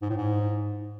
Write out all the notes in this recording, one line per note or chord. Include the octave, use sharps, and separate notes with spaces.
G#2
A2
G#2